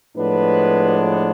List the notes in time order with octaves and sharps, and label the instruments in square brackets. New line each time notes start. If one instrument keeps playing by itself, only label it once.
[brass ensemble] A2 F3 G#3 B3 D4 B4